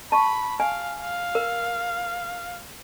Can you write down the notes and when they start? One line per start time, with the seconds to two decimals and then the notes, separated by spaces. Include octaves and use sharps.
0.12 A5 B5 C#6
0.60 F5 G#5
1.01 F5
1.35 A#4